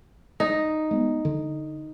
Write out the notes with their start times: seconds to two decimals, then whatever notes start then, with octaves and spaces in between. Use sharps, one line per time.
0.40 D#4
0.91 G#3 B3
1.25 D3